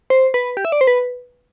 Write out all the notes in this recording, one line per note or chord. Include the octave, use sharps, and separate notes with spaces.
C5
B4
G4
E5
D5
C5
B4